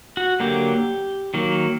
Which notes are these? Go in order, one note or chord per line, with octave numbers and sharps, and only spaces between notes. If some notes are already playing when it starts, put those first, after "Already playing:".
F#4
D3 F#3 A#3 G4
D#3 F#3 A#3